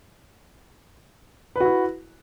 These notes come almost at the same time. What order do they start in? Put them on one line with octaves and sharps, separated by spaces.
B4 F#4 E4